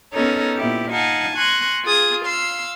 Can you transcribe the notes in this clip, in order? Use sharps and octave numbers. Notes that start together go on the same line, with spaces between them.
B3 C#4 D#4 A4 A#4 C#5
A#2 B3 E4 G4
D#4 F5 F#5 G#5 A5
G#5 C6 C#6 F#6 G#6 A#6
F4 G#4 D#6
F5 C6 E6